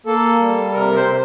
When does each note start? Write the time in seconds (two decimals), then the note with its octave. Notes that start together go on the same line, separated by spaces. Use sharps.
0.06 A#3 A4
0.40 G3
0.74 C3 A#4
0.96 C5
1.07 C3